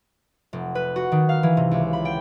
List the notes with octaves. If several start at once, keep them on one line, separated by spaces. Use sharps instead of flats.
F1
B4
F#4
D#3
F5
E3
C3
C#2
B5
G5